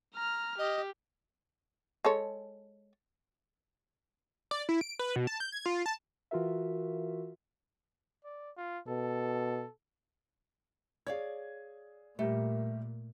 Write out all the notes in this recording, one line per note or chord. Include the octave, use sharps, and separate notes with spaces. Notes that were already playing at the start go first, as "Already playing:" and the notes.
A#5 F6
G4 D#5
G#3 A4 C#5
D5
E4
D7
B4
B2
A5
G6
G#6
F4
A5
E3 F4 F#4 A#4 E5
D5
F4
B2 A4
G#4 C#5 D5 F5 G#6
A#2 G3 A3 G4 A#4